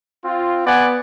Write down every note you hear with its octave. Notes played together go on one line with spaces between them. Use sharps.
C4 F4
B3 D5 F#5 G#5